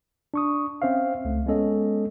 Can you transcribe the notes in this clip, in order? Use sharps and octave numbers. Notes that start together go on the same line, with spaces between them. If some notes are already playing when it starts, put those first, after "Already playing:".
D4 C#6 D#6
C4 C#4 C5 E5 F5
C#2 A3
G#3 B3 C#4 A4 D#5